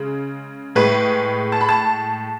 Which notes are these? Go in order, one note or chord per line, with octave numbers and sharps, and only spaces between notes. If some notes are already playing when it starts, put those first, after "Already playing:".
Already playing: C#3 G#3
A2 G#3 B4
A5
B5
A5